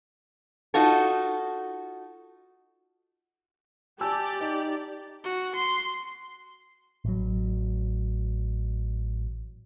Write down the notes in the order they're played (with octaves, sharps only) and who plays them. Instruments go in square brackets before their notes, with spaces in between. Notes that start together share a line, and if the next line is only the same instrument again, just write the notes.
[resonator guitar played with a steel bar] D#4 F4 F#4 A4
[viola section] G4 D5 [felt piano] G#5 A5 E6
[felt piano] D#4
[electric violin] F#4
C6
[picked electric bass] A1 F#3